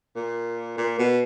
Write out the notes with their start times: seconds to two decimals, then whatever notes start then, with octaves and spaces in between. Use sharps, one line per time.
0.16 A#2
0.77 A#2
0.99 B2